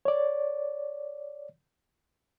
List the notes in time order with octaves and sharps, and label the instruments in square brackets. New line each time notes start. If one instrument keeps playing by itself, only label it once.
[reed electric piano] C#5 D5